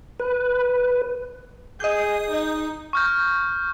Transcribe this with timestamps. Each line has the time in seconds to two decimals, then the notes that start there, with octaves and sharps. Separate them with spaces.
0.20 B4
1.80 G#4 D#5 G6
2.31 D#4
2.93 C#6 F6 G6